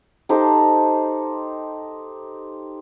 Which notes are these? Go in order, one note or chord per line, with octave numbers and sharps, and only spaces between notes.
D#4 G4 A4 C5